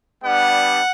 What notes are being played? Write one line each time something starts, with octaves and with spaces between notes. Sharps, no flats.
G3 B3 D4 F#5